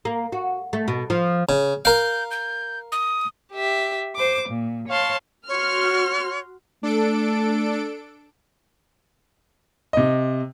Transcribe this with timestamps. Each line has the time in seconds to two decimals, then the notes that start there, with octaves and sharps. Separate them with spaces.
0.05 A#3
0.32 F#4
0.73 A3
0.88 B2
1.10 F3
1.49 C#3
1.85 A#4 F5 G6
2.31 G6
2.92 D#6
3.52 G4 E5
4.16 C5 D6
4.49 A#2
4.88 C#5 F5 A5 C6
5.49 F#4 C#5 C6 F6
6.83 A3 D4 A4 D7
9.93 C3 D#5